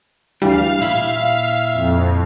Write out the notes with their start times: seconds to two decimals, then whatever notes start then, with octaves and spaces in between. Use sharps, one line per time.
0.42 D2 E3 G3 D4 F5
0.81 A#2 E4 E5 B5
1.73 F2